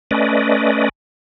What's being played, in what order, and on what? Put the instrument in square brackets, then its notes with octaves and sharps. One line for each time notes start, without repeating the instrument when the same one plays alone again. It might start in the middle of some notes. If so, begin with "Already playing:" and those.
[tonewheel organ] A3 C#4 B4 D5 D#5